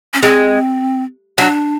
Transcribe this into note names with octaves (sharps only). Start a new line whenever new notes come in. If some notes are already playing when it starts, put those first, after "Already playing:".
C#4
G#3 C4
F#3 D4